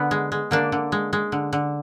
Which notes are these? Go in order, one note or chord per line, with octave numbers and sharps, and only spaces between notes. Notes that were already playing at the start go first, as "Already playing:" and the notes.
Already playing: D3 B3
G#3
G#3
D3 A#3 D4
D3
G#3
G#3
D3
D3